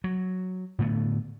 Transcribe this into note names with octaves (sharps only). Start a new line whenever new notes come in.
F#3
A2 D3 A3 B3